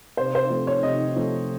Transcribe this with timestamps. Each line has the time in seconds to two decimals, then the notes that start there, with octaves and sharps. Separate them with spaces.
0.17 C3 C5
0.35 C5
0.50 F3 A3 C4
0.67 C#5
0.83 C3 D#5
1.16 F3 A3 C4